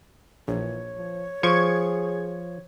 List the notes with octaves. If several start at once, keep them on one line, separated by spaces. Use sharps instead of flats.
A#1 E3 C#5
F3
F3 G#4 C#6 G#6